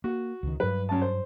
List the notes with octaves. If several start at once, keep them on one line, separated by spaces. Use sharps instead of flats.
A#3 F#4
C#2 D#3
G2 F#3 B4
F#2 C#4 A5
C5